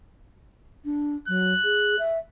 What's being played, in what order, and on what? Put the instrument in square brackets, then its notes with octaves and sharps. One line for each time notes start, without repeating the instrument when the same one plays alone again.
[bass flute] D4
[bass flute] F#3 [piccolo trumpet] F#6
[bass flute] G#4
E5